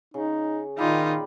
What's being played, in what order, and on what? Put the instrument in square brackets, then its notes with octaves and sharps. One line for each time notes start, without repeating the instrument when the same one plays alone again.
[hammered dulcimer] C#3 [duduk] D#4
[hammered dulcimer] A#2 G4 B5 [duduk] D#3 [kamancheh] D#4 F4